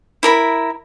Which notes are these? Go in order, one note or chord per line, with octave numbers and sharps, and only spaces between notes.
E4 A#4 B5